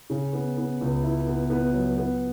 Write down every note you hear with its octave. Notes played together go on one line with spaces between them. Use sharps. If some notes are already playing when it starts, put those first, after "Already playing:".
C#3
B3
B3
C#2
E4
B3
B3
F#3
B3